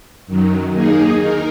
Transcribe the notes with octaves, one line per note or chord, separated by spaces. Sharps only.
F#2 D#3 F#3
D#2 D#3 A#3 D#4 G#4
D#4 A#4